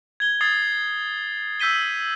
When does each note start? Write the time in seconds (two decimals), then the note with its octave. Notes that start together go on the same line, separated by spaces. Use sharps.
0.20 G#6 G7
0.41 D#6 G#6 A6 C7
1.60 E6 G6 B6 D#7 G7